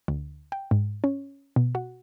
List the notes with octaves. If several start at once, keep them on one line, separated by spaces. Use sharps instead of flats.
D2
G5
G#2
C#4
B2
F#4